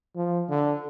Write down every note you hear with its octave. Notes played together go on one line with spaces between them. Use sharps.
F3
D3